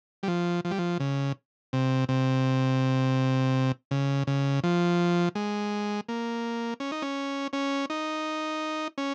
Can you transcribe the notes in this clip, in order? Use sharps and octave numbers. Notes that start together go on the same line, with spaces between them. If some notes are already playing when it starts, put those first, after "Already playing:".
G3
F3
F3
G3
F3
C#3
C3
C3
C#3
C#3
F3
G#3
A#3
C#4
D#4
C#4
C#4
D#4
C#4